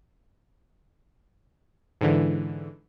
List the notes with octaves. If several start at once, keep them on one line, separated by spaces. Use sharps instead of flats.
G#2 D3 E3